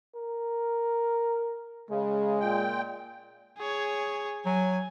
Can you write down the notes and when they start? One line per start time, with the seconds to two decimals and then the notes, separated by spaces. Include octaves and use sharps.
0.15 A#4
1.89 C#3 G#3
2.41 A#2 G5
3.58 G#4 C#5
4.46 F#3 G#5